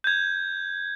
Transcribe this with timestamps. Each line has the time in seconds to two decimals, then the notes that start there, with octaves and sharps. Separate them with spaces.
0.04 G6 G#6